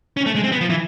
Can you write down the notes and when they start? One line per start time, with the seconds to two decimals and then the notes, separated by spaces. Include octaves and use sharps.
0.17 C#4
0.26 A3
0.35 G#3
0.44 C4
0.52 B3
0.61 F3
0.70 E3